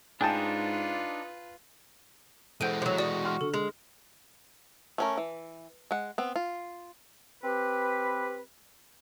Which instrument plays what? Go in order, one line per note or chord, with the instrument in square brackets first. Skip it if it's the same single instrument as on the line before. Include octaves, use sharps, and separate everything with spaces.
[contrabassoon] G#2 [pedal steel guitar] D4 D#4 [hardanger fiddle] F4 B4 [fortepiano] G#4 G5 A5
[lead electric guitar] E3 G#3 [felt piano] A4 C5 F#5 [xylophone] G6 D7 D#7
[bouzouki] F3 F#3
[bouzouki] F#4 [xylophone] D5 D#6
[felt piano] F#5 C6 F6
[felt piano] D3 [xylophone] A4
[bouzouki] G#3
[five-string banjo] A3 C#4 A#4
E3
G#3 F#5
B3 C4
F4
[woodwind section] C4 G4 B4